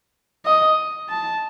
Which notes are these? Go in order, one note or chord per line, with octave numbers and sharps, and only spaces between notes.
D#5
A5